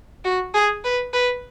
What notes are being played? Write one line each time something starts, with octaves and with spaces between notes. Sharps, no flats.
F#4
G#4
B4
B4